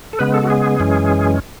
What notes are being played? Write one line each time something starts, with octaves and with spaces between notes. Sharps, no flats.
A4
C#3 G#3 B3 B4
A4
F#4
G#4
F#2 E3 G#3 C#4